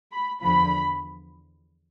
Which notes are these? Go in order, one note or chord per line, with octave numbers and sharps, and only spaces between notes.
B5
E2 D3 F3 B5